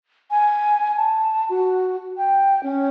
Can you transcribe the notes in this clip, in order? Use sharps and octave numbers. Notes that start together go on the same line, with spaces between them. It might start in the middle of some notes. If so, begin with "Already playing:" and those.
G#5
A5
F#4
G5
C#4